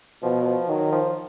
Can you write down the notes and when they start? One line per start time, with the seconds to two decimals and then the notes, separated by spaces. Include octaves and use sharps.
0.23 B2 F3
0.42 F#3
0.46 F3
0.68 D#3 F#3
0.92 F3